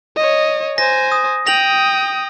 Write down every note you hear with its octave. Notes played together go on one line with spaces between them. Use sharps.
C#5 D#5
C5 G#5 A#6
D#6
G5 D#6 A#6 F7 F#7